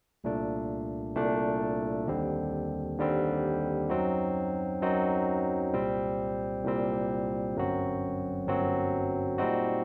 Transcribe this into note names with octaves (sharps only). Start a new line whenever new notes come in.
C2 A#2 A3 D4
C2 A#2 A3 D4
D#2 D3 G3 C4
D#2 D3 G3 C4
F#2 F#3 C4 D#4 F#4
F#2 F#3 C4 D#4 F#4
C2 A#2 G3 C4
C2 A#2 G3 C4
G1 F#2 F#3 C4 F#4
G1 F#2 F#3 C4 F#4
A#2 G3 C4 D#4 F#4